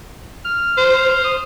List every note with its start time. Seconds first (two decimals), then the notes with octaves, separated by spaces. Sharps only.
0.45 F6
0.77 C5
1.08 C5
1.24 D#6